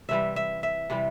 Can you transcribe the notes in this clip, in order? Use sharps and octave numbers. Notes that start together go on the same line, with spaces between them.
C3 E3 G3 E5
E5
E5
C3 E3 G3